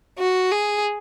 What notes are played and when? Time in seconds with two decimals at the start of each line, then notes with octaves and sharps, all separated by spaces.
0.19 F#4
0.52 G#4